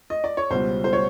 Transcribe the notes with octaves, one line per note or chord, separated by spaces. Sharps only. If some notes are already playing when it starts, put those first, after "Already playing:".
D#5
D5
C#5
C#2 B2 G3 B3 C5
C5
C#5